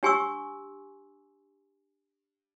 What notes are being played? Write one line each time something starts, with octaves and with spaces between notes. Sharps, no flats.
D4 G4 G#5 C6 C#6 E6